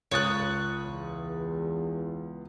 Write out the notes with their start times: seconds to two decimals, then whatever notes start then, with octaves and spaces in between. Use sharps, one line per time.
0.11 C#2 C#5 D#6 F#6 A6
0.85 E2